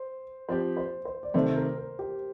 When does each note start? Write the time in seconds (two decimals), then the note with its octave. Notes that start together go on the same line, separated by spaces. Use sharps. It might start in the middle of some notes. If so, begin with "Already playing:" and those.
Already playing: C5
0.49 F3 C4 G4 C5
0.77 C5
1.05 C5
1.23 D5
1.34 C3 D#3 A3 C4 C5
1.56 A#4
1.78 A#4
1.99 G4